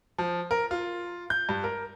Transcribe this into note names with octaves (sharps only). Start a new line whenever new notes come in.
F3
A#4
F4
G6
G2
A#4